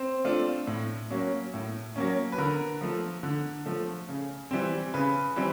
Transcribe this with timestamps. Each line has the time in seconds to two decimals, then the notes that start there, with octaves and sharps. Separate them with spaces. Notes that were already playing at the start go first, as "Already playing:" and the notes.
Already playing: C4 C5
0.25 A3 D4 F4
0.67 A2
1.10 F#3 A#3 C#4
1.54 A2
1.96 F#3 A#3 C#4
2.32 B4
2.38 D3 A#4
2.81 F3 A3
3.23 D3
3.66 F3 A3
4.09 C#3
4.51 E3 G3 C4
4.94 C#3 B4
5.36 E3 G3 C4